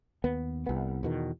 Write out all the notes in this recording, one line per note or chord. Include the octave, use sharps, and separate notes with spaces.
D#2 B3
C2 B3
E2 B2 D#3